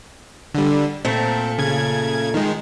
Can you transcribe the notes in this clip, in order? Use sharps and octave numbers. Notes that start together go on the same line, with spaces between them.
D3 G3
A#2 A3 C4
C#3 G#6
D#3 G#3